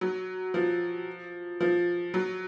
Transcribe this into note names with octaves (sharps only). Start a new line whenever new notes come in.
F#3
F3
F3
F#3